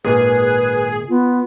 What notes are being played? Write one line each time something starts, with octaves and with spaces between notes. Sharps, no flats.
G#1 A#2 D#3 G#4 B4
B3 F4